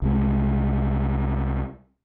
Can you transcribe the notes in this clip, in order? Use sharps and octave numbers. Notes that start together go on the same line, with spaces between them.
C2 G#3